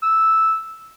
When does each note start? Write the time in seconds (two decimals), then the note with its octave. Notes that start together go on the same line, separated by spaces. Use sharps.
0.03 E6